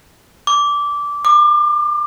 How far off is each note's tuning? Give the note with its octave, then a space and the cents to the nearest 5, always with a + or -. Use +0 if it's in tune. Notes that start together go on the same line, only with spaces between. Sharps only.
D6 -15
D6 +30